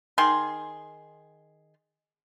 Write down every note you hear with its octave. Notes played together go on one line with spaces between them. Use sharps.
D#3 G#4 C6